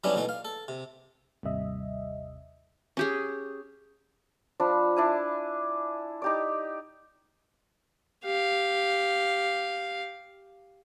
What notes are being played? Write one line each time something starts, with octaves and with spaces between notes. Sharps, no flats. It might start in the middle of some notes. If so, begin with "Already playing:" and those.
F#3 G3 B3 C#4 D4 E4
B2 E3 A3 D#4
F5
A4
C3
G#1 D#2 C3 G3 D#5 E5
C#4 G4 G#4
F3 D4 B5
D4 E4 G#5
D#4 G4 D5
G4 F5